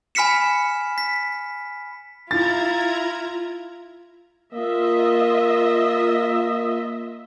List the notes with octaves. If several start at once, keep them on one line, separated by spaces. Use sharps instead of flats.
G#5 B5 F6 B6 C#7 E7
B6
E4 F4 A#5 G#6 A6
A#3 F4 D#5 E5